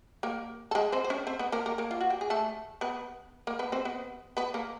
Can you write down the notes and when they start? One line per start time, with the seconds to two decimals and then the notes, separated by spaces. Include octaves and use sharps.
0.23 A#3 A#4
0.71 A4
0.75 G#3 G#4
0.92 C4 C5
1.04 C5
1.10 C#4 C#5
1.27 C4 C5
1.39 B3 B4
1.52 A#3 A#4
1.66 A#3 A#4
1.78 A#3 A#4
1.91 F4
2.01 F#4
2.10 G4
2.21 G#4
2.30 A3 A4
2.81 B3 B4
3.47 A#3 A#4
3.59 B3 B4
3.72 C4 C5
3.85 B3 B4
4.37 B3 B4
4.54 A#3 A#4